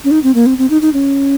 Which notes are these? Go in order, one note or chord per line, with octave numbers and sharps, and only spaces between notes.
C#4
D#4
C4
A#3
C4
C4
D#4
D#4
C#4